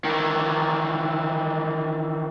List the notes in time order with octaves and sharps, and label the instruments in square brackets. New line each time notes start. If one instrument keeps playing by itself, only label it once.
[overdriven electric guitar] D#3 E3